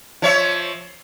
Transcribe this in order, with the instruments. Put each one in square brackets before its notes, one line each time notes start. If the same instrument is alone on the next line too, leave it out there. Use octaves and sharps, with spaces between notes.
[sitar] F3 C#5 E5